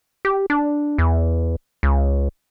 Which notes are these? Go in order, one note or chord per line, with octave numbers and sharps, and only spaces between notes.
G4
D4
E2
C#2